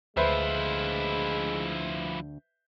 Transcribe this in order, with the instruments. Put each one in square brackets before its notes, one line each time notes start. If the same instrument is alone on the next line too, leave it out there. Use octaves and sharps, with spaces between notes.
[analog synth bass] D2 [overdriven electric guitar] F3 E4 [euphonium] G#3 [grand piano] B4 C5 E5